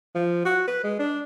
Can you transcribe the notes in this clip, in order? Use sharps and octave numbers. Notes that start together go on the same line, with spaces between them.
F3
F#4
B4
G#3
D4